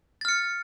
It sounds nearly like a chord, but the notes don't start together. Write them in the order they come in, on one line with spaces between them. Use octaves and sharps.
A6 F6 C#7